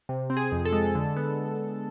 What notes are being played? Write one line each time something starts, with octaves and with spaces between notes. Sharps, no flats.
C3
C4
G#4
F2
A4
G#3
D3
B3